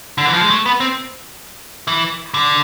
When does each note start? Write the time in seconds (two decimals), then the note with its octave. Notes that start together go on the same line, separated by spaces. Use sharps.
0.18 D3
0.26 E3
0.34 F3
0.42 G#3
0.50 A3
0.66 B3
0.80 C4
1.88 E3
2.34 D3